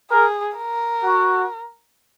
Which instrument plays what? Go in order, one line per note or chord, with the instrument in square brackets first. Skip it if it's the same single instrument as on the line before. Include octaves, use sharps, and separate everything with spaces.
[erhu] G#4 [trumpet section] A#4
[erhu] A#4
[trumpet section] F#4